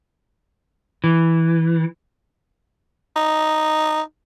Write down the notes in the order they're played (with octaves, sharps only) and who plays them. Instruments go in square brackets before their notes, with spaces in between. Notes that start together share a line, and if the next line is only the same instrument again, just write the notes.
[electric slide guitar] E3
[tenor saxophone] D#4